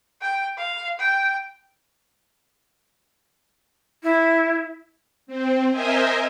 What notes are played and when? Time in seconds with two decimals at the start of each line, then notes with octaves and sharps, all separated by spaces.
0.22 G5
0.58 F5
0.99 G5
4.03 E4
5.27 C4
5.70 A#4 C5 D#5 E5 G#5